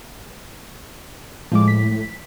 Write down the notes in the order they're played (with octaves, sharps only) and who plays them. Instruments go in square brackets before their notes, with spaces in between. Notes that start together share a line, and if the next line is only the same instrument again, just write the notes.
[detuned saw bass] A2 [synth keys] F3 G#3 D6
[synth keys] B6